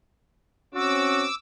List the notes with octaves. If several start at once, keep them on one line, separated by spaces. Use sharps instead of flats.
C4 C#4 F#4 D6 E6